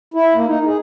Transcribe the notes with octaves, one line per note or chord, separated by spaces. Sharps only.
E4
A#3
D#4
G#4